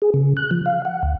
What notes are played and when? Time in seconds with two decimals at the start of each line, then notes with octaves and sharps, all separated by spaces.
0.02 G#4
0.14 C#3
0.37 F#6
0.51 F3
0.66 F5
0.85 F#5
1.03 D2